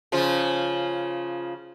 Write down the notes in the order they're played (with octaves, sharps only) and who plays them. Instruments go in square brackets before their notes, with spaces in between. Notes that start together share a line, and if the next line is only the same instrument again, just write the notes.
[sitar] C#3 F3 F4